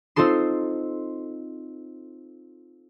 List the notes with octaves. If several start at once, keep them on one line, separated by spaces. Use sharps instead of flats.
C4 D#4 F4 A4 C6